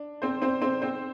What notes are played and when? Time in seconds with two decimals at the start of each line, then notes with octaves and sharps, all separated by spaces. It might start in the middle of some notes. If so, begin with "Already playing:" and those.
Already playing: D4
0.22 C4 C5
0.42 C4 C5
0.62 C4 C5
0.82 C4 C5